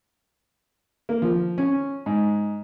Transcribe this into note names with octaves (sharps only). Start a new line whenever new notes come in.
A#3
F3
C#4
G#2